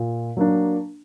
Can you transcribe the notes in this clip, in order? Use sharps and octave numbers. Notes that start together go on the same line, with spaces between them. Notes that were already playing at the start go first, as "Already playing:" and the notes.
Already playing: A#2
F#3 A#3 D4